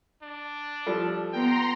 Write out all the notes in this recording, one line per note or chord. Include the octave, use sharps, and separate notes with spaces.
D4
F3 G3 A4
B3 G5 A#5 C6